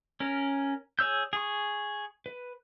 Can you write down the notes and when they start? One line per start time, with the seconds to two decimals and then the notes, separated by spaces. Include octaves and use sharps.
0.20 C#4 A#4
0.99 G#4 C#5 E6 G6
1.33 G#4 C#6
2.26 B4